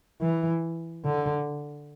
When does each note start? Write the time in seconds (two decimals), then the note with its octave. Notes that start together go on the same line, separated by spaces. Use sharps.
0.22 E3
1.05 D3